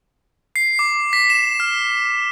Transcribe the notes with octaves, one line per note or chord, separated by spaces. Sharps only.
C7
D6
B6
E7
F6